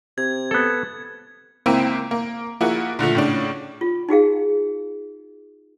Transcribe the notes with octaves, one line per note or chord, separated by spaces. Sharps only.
C3 G#6
B3 A4
C#2 A#3 C4 E4 D#7
A#3
F3 A#3 E4 F#4 G#4
A#2 D3 F3 A3
A2 C#3 D4
F4
D#4 F#4 G#4 F5